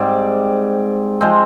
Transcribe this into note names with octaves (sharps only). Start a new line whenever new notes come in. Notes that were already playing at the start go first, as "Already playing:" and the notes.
Already playing: G#2 G3 C4 D5
F3 G#3 C4 C5